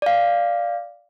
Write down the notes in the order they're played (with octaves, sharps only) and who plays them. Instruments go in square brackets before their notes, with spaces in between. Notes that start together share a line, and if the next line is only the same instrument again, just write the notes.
[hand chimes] D5 F5